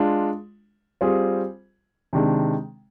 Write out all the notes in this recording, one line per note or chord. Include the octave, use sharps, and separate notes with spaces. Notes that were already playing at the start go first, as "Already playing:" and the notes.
Already playing: G#3 D4 F4
G3 C4 F4 G#4
C3 D#3 G#3 D4